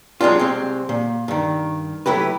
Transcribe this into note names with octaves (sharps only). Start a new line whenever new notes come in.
F#3 G#3 C4 D4 F4
C2 G#3 C4
A#2
G2 D#3
F#3 A3 E4 G4 B4